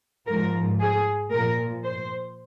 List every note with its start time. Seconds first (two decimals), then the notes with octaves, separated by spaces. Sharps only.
0.27 G#2 F3 A#4
0.79 G#4
1.31 A#2 F3 A#4
1.84 C5